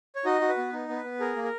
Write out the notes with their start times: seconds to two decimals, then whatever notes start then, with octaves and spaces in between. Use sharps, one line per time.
0.15 C#5
0.25 D#4 F#4 D#5
0.41 F#4
0.49 B4
0.57 B3
0.73 D#4
0.89 B3
0.96 B4
1.04 B3
1.20 G#4 A#4
1.36 A#3
1.44 A#4